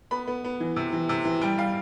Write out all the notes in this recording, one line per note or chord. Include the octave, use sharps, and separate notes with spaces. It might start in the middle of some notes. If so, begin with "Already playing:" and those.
B3 B5
B3
B3
E3
C3
E3
C3
E3
G3 G5
G3 F5